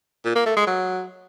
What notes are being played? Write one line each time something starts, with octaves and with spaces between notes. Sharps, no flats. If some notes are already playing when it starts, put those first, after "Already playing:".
A#2
A#3
A3
G#3
F#3